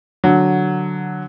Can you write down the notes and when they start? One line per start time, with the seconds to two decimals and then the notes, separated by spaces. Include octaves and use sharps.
0.24 D3 F#3